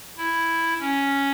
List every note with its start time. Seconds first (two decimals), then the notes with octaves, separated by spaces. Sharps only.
0.17 E4
0.80 C#4